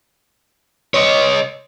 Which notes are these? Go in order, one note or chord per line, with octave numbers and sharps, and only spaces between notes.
C#5 D#5